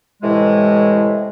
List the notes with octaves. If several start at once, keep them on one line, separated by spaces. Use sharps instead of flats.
A2 C3 E3 G#3